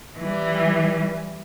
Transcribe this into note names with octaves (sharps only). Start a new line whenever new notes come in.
E3 G3